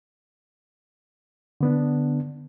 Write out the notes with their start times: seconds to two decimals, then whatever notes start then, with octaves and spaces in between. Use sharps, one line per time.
1.61 D3 B3 D4